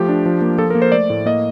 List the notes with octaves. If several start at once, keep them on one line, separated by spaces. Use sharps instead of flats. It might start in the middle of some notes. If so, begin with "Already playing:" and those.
Already playing: F3 A3 G4
D4
F3
A#3
F3 A4
A#4
A#3
C5
A3 D5
A2
A#3 D#5